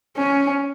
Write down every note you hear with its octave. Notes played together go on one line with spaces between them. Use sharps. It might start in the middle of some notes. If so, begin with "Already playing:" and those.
C#4